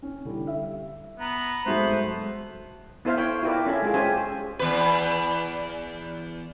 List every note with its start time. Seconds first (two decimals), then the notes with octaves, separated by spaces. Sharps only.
0.02 C#4
0.25 D3 G3 E4
0.47 E5
1.20 B3 A#5
1.66 G#2 F#3 G#3 A3 B3 C5
3.05 B3 E4 A4 C5 E5 F5
3.17 C#5 G5
3.43 E4 F4 G4 A#4 B4 D5
3.67 C#4 A4 E5
3.82 G#3 F4 G#4
3.94 C#4 G4 G#4 C5 E5 G#5
4.59 E2 B4